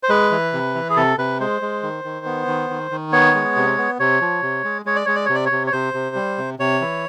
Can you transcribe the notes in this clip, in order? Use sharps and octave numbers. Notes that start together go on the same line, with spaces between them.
C5
G#3 B4
E3
C3
E3
G#4
C3 A4
C3 B4
G#3 C5
G#3
D#3
D#3
B3
D#3
D#3
D#3
B3 C#5
G#3
C3
B3
C3 C#5
F3
C3
G#3
G#3 C#5
D5
G#3 C#5
D5
C3 C#5
D5
C#5
C3
C#5
C3 C5
C3
G3
C3
C3 C#5
E3